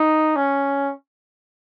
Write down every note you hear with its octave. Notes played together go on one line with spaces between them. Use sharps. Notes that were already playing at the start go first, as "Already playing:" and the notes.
Already playing: D#4
C#4